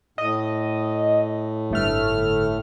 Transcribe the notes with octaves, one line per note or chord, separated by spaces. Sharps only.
A2 D#5
G1 A3 F6